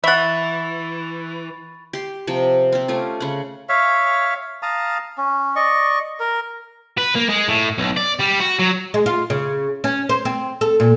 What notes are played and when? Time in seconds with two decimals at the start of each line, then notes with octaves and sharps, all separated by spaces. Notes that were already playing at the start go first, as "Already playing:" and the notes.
0.04 E3 E5 F#5 B5 C#6 A6
1.93 G4 C6
2.27 C3 F3 G5
2.72 C4 G4
2.88 A3 C#4 F4
3.20 C#3 F#5
3.69 C#5 E5 F5
4.63 F5 A5 A#5 D#6
5.18 C#4
5.56 D5 D#5 C#6
6.20 A#4
6.98 B4
7.15 A#3
7.29 G#3
7.48 A2
7.78 B1
7.97 D5
8.19 G3
8.40 F#4
8.59 F#3
8.94 G#3
9.06 F4
9.30 C#3
9.84 C#4
10.09 C5
10.25 C4
10.61 A4
10.80 A#2